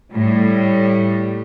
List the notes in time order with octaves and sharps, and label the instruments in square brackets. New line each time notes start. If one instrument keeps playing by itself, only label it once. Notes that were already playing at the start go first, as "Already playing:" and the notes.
[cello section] A2 G3